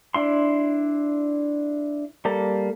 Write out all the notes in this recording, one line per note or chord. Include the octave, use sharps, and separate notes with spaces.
D4 E4 C6
G3 A#3 A4